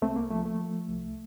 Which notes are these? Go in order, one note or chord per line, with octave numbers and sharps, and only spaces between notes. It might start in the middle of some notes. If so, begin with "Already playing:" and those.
C2 A3 C4
A#3
F3 A3
A3
F3
C2